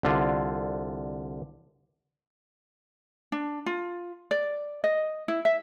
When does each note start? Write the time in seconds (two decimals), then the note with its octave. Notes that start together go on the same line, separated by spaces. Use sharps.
0.03 C2 D3 F4
3.32 D4
3.66 F4
4.31 D5
4.84 D#5
5.28 E4
5.45 E5